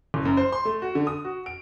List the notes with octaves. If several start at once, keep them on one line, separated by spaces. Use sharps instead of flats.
F#1
F#2
C5
C6
A3
F#4
D3
D#6
F#4
D7